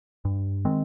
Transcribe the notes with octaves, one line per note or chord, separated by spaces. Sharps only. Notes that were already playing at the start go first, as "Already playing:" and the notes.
G2
D#3 G#3 C4